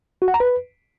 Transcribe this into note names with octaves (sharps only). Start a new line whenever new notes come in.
F#4
F#5
A#5
B4